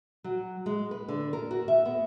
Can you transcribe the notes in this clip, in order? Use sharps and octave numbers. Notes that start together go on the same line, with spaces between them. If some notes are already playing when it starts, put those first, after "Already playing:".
F#3
G#3
B4
D3
A#4
F#4
E5
B3